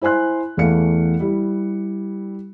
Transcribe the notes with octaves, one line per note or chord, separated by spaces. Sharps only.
E4 C5 G#5 C6 F#6
E2 E3 A3 F5 C#7
G3 E4 G4